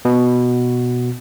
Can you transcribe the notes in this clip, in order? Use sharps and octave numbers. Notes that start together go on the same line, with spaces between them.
B2